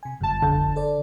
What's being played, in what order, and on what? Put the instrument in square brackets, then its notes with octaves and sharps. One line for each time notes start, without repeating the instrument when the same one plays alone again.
[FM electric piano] C3 G#5
[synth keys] G1 A5 [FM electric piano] F#2
[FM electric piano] A#1 F2 G6 [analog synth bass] D3
[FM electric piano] A4 C5 D5